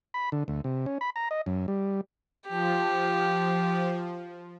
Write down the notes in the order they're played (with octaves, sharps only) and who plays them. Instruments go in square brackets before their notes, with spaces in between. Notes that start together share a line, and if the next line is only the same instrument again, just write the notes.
[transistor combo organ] B5
D3
D2
C3
C#4
B5
A#5
D#5
F#2
G3
[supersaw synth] F3 [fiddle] G4